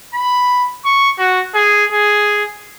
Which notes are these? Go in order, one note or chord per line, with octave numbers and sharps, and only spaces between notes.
B5
C#6
F#4
G#4
G#4